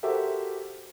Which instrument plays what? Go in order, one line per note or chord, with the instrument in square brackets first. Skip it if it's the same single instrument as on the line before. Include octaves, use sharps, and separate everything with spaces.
[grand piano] F#4 G4 A4 A#4 C5 E5